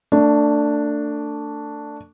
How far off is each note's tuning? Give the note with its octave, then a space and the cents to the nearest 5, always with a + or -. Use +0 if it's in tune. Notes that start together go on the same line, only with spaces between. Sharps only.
A3 +30 D4 +0